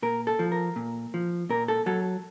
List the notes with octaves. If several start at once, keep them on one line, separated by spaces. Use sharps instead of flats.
A#2 A#4
A4
F3
A#4
A#2
F3
A#2 A#4
A4
F#3 A4